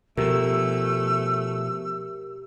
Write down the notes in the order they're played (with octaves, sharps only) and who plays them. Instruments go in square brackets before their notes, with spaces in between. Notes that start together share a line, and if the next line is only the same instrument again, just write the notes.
[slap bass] B2 F3 [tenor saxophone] A3 [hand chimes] G4 A#4 [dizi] E6